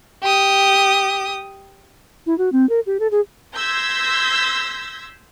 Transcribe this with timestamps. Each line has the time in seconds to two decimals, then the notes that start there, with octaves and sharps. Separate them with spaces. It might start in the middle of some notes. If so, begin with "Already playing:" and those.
0.23 G4 D#6
2.26 E4
2.38 F#4
2.52 C4
2.69 A#4
2.86 G4
3.00 A4
3.11 G#4
3.55 C6 E6 G6 G#6 A#6 B6